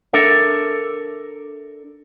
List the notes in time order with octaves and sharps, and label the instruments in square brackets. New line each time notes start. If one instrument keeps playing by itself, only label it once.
[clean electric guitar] D4 A4 A#4 E5